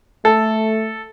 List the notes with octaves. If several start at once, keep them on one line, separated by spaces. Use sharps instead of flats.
A3 A4